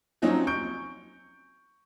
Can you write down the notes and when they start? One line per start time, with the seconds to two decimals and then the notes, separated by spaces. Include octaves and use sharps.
0.22 F3 F#3 C4 C#4 D#4
0.47 C#6 G6 D7